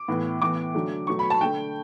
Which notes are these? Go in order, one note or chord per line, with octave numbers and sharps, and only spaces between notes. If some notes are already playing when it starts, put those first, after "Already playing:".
Already playing: D6
A2 E3 B3
A2 E3 B3 D6
D3 F#3 A3
B2 F#3 A3 C#6
B5
A5
D3 A3 G5